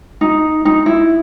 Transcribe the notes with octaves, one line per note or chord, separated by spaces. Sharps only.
D#4
D#4
E4